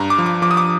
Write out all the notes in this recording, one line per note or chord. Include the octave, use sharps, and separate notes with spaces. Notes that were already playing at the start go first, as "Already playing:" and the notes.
Already playing: G2 A#5
D6
F3
D6
F3 D6
D#6
D6